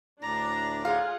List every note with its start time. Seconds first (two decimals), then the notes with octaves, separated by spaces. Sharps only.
0.22 D2 A2 D4 D5 A#5
0.85 F4 G#4 F5 F#5